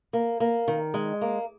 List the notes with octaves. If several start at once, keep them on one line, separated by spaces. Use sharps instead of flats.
A#3
A#3
D#3
G#3
A#3